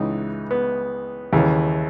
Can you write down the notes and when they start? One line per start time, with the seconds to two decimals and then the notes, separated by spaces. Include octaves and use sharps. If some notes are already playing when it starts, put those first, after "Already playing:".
Already playing: C#2 C#3 E3 D#4
0.51 B3
1.32 D#2 C#3 E3